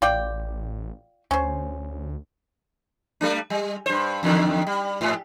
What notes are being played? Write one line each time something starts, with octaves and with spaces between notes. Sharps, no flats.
A1 F4 D5 G5
D2 C#4 C5
G3 A3 D4
G3
G2 C5
E2 D3 D#3
G3
G#2